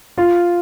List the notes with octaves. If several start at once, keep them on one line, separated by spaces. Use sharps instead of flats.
F4